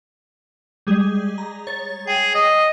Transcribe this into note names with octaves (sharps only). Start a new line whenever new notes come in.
G3 G#3 G#4
A#5
C#5 A6
G#4 G5
D#5